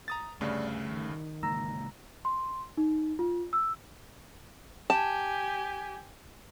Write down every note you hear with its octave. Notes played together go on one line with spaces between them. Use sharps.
A#5 D#6 A6
D2 G2 C#3 A3 D5
D#3
C#3 G#3 A#3 A#5 E6 A#6
C6
D#4
F4
E6
G4 G#5 A5